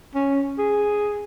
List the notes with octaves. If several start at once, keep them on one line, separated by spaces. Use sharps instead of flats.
C#4
G#4